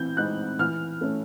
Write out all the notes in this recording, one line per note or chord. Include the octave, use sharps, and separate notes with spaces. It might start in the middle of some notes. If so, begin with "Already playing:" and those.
Already playing: E3 C4 G6
G#3 C4 D#4 F#6
E3 F6
A3 C#4